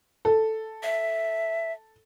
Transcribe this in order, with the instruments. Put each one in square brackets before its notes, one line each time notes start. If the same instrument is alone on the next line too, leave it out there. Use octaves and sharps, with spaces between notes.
[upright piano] A4
[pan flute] E5